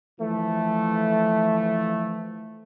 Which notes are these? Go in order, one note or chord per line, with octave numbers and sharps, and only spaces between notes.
E3 F3 A3